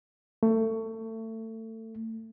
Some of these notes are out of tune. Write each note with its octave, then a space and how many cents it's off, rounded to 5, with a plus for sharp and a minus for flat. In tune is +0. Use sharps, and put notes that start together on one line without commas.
A3 +25